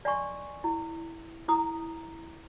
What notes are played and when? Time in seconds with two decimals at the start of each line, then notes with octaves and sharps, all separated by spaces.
0.05 D5 D#5 G#5 C6 C#6
0.64 E4
1.48 E4 A#5 D#6